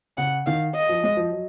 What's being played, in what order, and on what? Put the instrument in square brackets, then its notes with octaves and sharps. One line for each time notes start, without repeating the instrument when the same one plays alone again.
[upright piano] C#3 [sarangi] F#5
[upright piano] D#3 [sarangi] F5
[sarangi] D#5
[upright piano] F3
G#3
F3
F#3